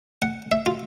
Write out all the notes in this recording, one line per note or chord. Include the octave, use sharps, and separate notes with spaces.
F#5
E5
F4